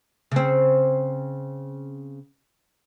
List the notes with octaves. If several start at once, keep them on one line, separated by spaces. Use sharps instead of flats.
C#3 C4